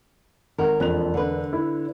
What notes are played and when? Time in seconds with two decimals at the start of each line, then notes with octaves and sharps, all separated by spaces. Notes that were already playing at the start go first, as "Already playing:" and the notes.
0.58 G#1 A#4 F#5
0.80 E1 F2 F#6 F7
1.14 D3 B4
1.53 E4